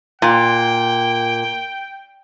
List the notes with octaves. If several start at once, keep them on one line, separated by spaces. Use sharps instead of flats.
A#2 G5